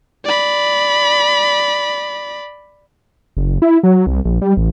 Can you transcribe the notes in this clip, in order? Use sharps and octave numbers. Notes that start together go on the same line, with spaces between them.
D5 B5
F#1
E4
F#3
C2
A#1
G3
A1